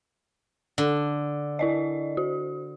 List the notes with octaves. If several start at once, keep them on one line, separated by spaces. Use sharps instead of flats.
D3
E4 D5 D#5
F#4